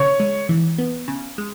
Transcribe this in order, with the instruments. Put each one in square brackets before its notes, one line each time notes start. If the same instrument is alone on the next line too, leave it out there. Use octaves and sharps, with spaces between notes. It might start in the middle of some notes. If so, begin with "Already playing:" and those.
Already playing: [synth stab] C#3 [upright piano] C#5 C#6
[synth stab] G#3
E3
B3
C#3
G#3